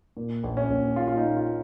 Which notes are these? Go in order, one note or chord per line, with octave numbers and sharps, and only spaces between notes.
A#2
A#1
C#4
A#1
A#2 F4
F4
D#4
A#2
F4